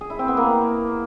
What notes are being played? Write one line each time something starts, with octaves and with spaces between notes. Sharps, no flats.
G#4
E4
C4
B3
A#3